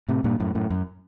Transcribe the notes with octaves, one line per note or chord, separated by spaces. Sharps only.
A2 C3
G2 A#2
F#2 A2
F#2 A2
F#2